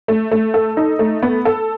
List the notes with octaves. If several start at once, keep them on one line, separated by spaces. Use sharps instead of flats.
A3
A3
A4
D#4
A3
B3
A4